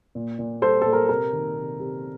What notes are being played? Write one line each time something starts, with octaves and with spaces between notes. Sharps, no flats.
A#2
A#2
G3 A4 C5
A#2 A4
A#4
C3 A#4
D#3
C3
C3